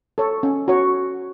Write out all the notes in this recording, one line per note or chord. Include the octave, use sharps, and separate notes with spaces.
A4 C#5
C#4
F#4 C#5